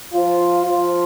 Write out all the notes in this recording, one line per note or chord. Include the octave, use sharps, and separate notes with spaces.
F3 F4
F3 F4